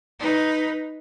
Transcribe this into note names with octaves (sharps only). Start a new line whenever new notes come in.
D#4 B4